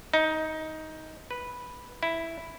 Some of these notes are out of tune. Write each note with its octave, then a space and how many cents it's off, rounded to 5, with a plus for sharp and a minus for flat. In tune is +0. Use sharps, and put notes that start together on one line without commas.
D#4 +15
B4 -5
E4 +0